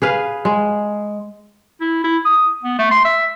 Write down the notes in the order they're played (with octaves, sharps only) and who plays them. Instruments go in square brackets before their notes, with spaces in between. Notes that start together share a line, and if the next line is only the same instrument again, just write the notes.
[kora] G#4 B4 F5
G#3
[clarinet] E4
E4
D#6
B3
A3
C6
E5